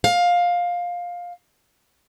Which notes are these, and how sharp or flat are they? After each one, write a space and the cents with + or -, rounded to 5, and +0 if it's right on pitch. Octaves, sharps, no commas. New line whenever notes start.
F5 +15